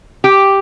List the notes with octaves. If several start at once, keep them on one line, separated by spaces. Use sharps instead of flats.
G4